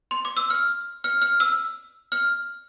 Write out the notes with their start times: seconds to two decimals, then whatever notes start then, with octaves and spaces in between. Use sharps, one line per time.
0.11 C6
0.25 D6
0.37 E6
0.50 F6
1.04 F6
1.22 F6
1.40 E6
2.12 F6